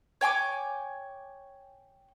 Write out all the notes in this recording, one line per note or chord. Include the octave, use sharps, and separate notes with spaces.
C#5 G5 G#5 D6